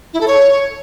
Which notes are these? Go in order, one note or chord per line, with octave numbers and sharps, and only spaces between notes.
E4
A4
C#5